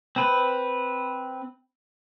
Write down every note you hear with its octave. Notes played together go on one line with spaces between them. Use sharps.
C4 B4